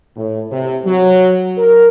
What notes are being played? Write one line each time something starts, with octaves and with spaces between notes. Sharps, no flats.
A2
C3
F#3
A#4